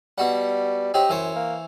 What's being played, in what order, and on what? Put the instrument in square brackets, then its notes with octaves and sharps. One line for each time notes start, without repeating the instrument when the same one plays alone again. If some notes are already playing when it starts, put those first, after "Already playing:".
[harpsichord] B2 F#4 F#5 [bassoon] G3
[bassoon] F#3 [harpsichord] C4 D#4 G4
[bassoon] F#2 [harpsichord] E3 C5 C#5
[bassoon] A#3